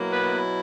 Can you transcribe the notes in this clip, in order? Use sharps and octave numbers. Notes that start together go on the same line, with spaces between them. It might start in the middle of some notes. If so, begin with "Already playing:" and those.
Already playing: B2 F#3 A#3 E4
B3 B4